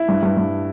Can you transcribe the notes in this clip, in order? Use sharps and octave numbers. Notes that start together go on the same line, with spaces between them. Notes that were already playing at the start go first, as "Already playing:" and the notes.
Already playing: E4
G2
G2
G2